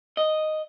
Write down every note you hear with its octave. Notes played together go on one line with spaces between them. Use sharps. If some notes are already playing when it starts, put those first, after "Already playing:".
D#5